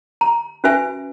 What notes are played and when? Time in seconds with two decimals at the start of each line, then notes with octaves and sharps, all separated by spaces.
0.21 A#5
0.64 C#4 F#4 B4 E5 G#5